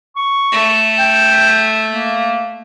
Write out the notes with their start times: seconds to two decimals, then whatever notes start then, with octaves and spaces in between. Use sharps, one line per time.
0.16 C#6
0.52 A3
0.99 G5
1.89 A#3